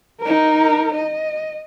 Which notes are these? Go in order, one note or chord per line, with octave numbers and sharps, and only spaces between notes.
D#4 A#4
D#5